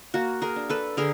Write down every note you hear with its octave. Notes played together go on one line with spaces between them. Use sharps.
A#3 F#4
G#4 A#4
D4
A4 B4
D3 G#4 A#4